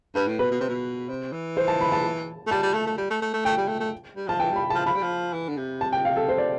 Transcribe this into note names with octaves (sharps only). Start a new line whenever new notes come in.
G2 B4
A2
B2 B4
B2
C3
B2
C3
E3
C5
A5
B5
A5
A3
G3 A5
G3
A3
A3
G3
A3
A3
A3
A3 G5
G3
A3
A3
G3
F3 A5
E3 G5
G3 B5
A5
F3
F3 B5
G3
F3
E3
D3
C3
A5
G5
F5
A4
C5
D5